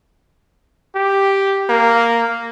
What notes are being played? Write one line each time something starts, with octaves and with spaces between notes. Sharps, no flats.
G4
A#3